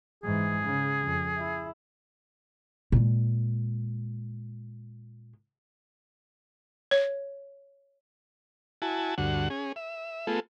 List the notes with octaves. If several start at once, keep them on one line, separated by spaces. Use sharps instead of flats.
G#2 E3 G#4
C#3
F2
E4
A#2 G#3
C#5
E4 F#4 G#5 A5
D2 G2 D3 F#4 F#5
C#4 G#4
E5
A3 B3 F4 G#4 A4